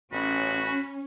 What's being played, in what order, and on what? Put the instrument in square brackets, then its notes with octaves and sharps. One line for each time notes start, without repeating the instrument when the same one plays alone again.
[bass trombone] A1 [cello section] C#4 [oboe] F#4 [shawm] B5